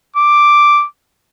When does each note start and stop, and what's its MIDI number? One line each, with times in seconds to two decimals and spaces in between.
0.16 0.86 86